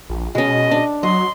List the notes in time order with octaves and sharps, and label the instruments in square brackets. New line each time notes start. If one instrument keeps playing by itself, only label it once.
[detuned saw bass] A#1
[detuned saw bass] B2 [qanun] G#3 C#4 [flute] D#5
[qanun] D4
[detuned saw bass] F#3 [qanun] D#5 [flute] C6